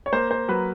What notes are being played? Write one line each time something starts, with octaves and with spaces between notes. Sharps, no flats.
C#5
A#3 C5
C5
F#3 B4